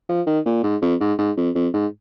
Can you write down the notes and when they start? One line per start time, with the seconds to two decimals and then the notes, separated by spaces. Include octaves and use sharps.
0.09 F3
0.26 D#3
0.45 A#2
0.63 G#2
0.82 F2
1.00 G#2
1.18 G#2
1.37 F2
1.55 F2
1.73 G#2